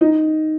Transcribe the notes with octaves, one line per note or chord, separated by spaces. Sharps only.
D#4